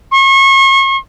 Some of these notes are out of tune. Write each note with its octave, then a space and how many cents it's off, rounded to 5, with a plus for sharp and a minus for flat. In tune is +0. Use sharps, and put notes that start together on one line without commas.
C#6 -35